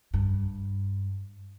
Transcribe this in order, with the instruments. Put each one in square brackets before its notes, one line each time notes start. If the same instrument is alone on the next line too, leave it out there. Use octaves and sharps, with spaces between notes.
[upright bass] G2